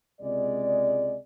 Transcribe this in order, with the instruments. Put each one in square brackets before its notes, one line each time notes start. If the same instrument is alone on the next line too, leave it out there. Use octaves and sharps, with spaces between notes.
[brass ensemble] C#2 C3 G#3 D5